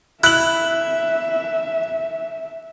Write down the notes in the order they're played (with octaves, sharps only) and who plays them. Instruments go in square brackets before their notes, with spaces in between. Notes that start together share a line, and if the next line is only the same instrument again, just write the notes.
[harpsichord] E4 [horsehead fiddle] E5 [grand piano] F#6 F#7